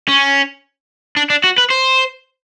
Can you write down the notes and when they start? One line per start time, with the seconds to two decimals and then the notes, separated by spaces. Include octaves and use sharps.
0.08 C#4
1.17 D4
1.30 D4
1.44 F#4
1.58 B4
1.71 C5